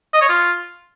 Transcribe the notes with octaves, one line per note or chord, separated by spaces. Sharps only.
D#5
C#5
F4